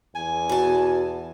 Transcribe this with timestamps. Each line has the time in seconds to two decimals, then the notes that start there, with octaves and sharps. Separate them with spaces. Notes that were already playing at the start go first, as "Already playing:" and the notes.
0.15 E2 G#5
0.49 B2 A5